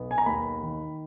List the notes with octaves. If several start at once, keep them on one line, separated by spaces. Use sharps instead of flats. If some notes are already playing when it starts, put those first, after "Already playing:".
Already playing: B1 B3
G#5
A#5
D#2 B5
D#3